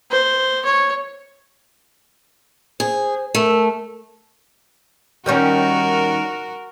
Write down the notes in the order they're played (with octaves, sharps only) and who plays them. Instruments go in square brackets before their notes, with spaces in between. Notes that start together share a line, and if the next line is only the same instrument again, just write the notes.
[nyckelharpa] C5
C#5
[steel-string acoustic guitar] G#4 [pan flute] C5
[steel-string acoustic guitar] A3 [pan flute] A#4
[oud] D#3 G3 C#4 [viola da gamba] F#4 A#4